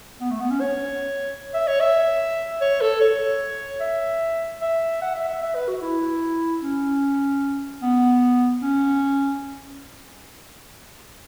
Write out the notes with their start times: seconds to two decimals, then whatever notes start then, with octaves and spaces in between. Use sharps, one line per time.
0.20 B3
0.30 A3
0.40 B3
0.50 C#4
0.60 C#5
1.54 E5
1.67 C#5
1.80 E5
2.61 C#5
2.81 A4
3.01 C#5
3.80 E5
4.61 E5
5.01 F#5
5.15 E5
5.28 E5
5.42 E5
5.55 B4
5.68 F#4
5.82 E4
6.62 C#4
7.82 B3
8.62 C#4